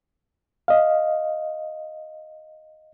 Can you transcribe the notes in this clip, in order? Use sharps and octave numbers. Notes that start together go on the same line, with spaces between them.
D#5 F5